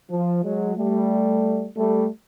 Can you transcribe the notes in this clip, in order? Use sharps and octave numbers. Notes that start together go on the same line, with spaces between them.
F3
F#3 G#3
G3 A3
G3 A3